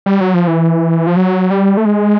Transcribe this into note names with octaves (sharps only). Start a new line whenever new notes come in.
G3
F#3
F3
E3
F3
F#3
G3
A3
G#3